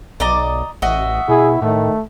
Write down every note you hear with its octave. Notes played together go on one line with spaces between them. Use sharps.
B1 D5 D#5 A#5
A1 F#4 D#5 E5
B2 E4 G#4
A2 D#3 A3